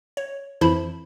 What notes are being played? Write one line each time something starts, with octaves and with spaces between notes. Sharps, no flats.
C#5
F2 E3 E4 C5 A5 B5